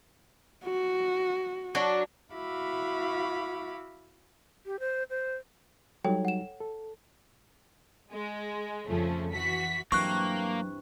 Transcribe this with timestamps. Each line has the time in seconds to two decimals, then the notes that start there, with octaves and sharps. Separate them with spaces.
0.64 F#4
1.75 F#3 D4 F#4
2.33 E4 F#4 E5 F5 B5 D6
4.66 G4
4.80 C5
5.10 C5
6.05 F#3 G3 D#4 A4 C#5 G5
6.25 F#5 E7
6.60 A4
8.11 G#3
8.86 F2 C#3 F3 A3 C#4
9.32 E3 F#4 B6
9.92 G2 E3 F#3 A#3 C4 C#6 F#6